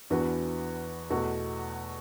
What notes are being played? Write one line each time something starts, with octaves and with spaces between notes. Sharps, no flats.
E2 E3 D4 F#4 B4
E2 B2 A3 F#4